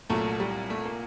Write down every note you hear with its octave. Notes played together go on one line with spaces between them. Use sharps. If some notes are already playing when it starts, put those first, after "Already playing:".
C2 A#2 F#3 A3
G3
A3
A#3